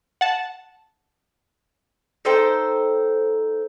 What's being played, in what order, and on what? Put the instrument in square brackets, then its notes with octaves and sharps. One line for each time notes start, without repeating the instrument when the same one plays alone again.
[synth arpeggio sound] F#5 A5
[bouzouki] D#4 A4 C5 G5